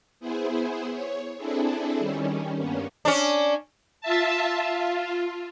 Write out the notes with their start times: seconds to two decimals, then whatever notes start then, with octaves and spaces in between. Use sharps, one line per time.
0.20 B3 E4 G#4 C5
0.90 C#5
1.38 C4 D4 E4 G#4 A4
1.98 D#3 G3 C#4
2.57 G2 A#3 B3 C#4
3.05 C#4 D4
4.01 F4 E5 A5
4.44 F4